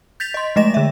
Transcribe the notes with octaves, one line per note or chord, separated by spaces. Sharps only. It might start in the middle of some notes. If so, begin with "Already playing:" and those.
G6 A6 B6 F7
D#5 C6
F3 G#3 A3 D#5 A#6 E7
D3 E5